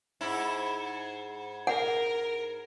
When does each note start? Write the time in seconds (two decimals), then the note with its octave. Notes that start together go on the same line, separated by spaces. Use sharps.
0.21 G#2 E4
1.67 A#4 F#5